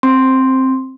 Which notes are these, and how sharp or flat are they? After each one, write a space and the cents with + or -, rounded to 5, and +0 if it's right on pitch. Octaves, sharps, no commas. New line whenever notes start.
C4 +10 C6 +0